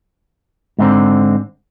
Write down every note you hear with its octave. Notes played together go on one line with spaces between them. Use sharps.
G#2 D3 C4